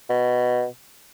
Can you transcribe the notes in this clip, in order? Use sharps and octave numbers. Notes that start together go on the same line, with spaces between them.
B2